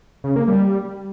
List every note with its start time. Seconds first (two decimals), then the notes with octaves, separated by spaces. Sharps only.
0.24 C#3
0.36 A#3
0.48 G3